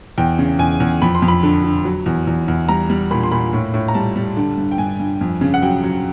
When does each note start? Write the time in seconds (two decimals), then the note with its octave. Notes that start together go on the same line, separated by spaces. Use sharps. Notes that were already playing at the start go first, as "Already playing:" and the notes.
0.18 E2 G5
0.39 C#3
0.59 E2 G#5
0.80 E2
1.02 F2 B5
1.15 C6
1.22 F2
1.28 B5
1.43 D3
1.64 D3
1.85 F#3
2.06 E2
2.27 E2
2.48 E2
2.69 G3 A#5
2.90 G3
3.11 A#2 B5
3.23 C6
3.32 A#2 B5
3.53 A2
3.74 A2
3.88 A#5
3.94 G3 A5
4.16 G3
4.37 D3
4.58 G2
4.71 G5
4.78 G2 G#5
5.00 G2
5.21 F2
5.41 C#3
5.54 F#5
5.63 F#3 G5
5.84 F#3